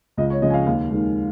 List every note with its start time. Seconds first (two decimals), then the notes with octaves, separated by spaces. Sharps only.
0.17 C#2 D#5
0.30 C#5
0.42 C#3 F3 G#3 D#5
0.50 G#5
0.54 F5
0.66 D#2 F5
0.91 D#3 G#3